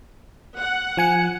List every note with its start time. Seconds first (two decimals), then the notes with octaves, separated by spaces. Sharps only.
0.59 F#5
0.97 F3 G#5 C#7